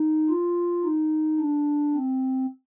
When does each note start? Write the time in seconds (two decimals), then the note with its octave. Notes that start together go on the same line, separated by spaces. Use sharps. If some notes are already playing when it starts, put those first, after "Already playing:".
Already playing: D#4
0.30 F4
0.84 D#4
1.39 D4
1.95 C4